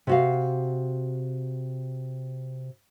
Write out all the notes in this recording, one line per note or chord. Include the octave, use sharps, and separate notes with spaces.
C3 F#4 F5